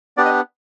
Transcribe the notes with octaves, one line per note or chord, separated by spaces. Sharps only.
B3 D4 G4 D5
D#5